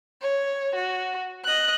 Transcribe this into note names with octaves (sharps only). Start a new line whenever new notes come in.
C#5
F#4
D#5 F#6